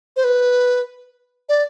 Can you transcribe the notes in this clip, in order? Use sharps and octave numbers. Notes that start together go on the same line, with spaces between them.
C5
B4
D5